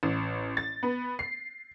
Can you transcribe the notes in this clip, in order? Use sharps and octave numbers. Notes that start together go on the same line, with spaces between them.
A1
A6
B3
C7